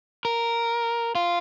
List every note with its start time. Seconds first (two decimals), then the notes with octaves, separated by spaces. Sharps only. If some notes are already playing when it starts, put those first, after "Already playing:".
0.25 A#4
1.15 F4